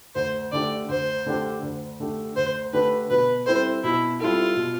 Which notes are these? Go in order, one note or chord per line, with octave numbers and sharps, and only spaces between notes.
D2 C5
D3 A3 D4 G4 D5
D2 C5
D3 A3 D4 G4
D2
D3 A3 D4 G4
D2 C5
D3 A3 D4 G4 B4
B2 B4
G3 C4 E4 A4 C5
B2 E4
G3 C4 E4 F4 A4
B2